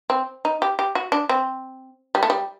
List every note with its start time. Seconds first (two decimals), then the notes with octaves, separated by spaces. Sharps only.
0.10 C4
0.45 D#4
0.62 G4
0.79 G4
0.95 F#4
1.12 D4
1.29 C4
2.15 G3
2.23 A3
2.30 G3